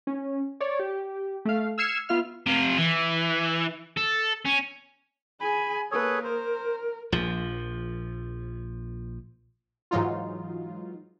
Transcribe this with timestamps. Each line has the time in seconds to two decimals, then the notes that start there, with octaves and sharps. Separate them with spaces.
0.07 C#4
0.60 C#5 D5
0.79 G4
1.45 A3 F5
1.78 E6 F6 G#6 C7 C#7 E7
2.09 B3 F4 E5 F6
2.47 C3 F4
2.78 E3
3.97 A4
4.45 C#4
5.40 G#4 G#5 B5
5.91 A#3 G#4 A4 B4 C#5
6.24 A#4 C5
7.12 A#1 F3
9.91 G#2 E3 F#3 D#4 F4